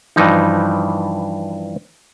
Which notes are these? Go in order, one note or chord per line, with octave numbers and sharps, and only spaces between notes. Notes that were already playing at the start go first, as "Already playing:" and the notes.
G2 E3 F3 D#4